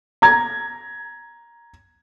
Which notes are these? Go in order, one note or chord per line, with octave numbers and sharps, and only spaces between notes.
A#5 G#6